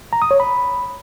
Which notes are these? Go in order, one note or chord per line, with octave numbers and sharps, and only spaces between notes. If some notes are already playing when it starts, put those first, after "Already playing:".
A#5
D#6
C#5
B5